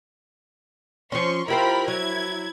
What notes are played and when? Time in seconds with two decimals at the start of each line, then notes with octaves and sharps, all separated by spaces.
1.12 F3 C#4 C6 C#6
1.48 E4 F4 G4 A#4 C5 B5
1.88 F#3 E4 G#6